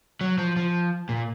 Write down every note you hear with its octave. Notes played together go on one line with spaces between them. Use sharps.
F#3
F3
F3
A#2